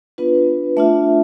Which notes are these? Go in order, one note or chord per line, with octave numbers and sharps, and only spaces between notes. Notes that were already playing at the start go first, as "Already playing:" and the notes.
B3 D4 F4 B4
A3 D4 F4 E5